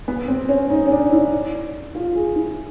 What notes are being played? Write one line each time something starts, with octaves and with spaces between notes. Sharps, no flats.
B3
C4
C#4
D#4
C#4
D4
E4
F4
G#4
E4